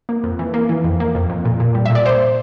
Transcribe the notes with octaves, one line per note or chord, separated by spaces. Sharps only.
A#3
F2
E3
A#3
E3
F2
A#3
F2
F2
A#2
A#2
G3
A#2 E5
D5
A#2 C5